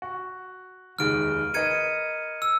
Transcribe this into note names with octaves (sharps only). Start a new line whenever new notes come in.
F#4
F1 D#2 G#3 F6 D7
A#4 B4 D#5 G#6 C#7 D#7
E6